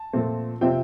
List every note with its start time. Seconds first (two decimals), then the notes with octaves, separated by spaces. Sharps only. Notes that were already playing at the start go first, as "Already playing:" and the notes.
Already playing: A5
0.13 A#2 F3 A3 C4
0.61 C3 F3 C4 E5 G5